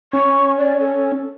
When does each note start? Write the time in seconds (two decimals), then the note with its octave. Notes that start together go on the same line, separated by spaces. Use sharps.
0.13 C#4 C#6
0.58 D5
0.80 A4